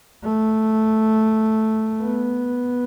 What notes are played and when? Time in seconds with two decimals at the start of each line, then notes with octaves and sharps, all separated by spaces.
0.24 A3
2.01 B3